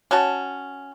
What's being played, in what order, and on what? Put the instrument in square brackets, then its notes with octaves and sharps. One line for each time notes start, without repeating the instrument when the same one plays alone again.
[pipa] C#4 F#4 A5